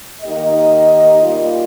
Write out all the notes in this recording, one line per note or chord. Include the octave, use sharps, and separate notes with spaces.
D#3 A#3 D#4 G4 D#5
G3 A#3 F4